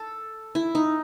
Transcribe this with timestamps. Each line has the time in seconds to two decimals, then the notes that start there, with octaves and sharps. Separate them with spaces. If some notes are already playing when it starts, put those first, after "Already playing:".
Already playing: A4
0.55 E4
0.75 D#4